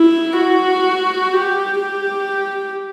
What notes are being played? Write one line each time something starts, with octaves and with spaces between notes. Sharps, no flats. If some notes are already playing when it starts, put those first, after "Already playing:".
Already playing: E4
F#4
G4
G4